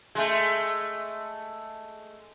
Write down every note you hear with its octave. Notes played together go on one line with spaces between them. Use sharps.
G#3 A3